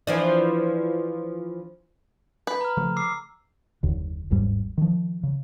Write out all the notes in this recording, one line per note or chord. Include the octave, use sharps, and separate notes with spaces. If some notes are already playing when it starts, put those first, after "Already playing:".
E3 F3 D4
B4
A#5 F6
C#3 F3 A3
D6 E6 C7
F#1 D#2 D3
G1 D#2 G#2 G3
D#3 F3
C#3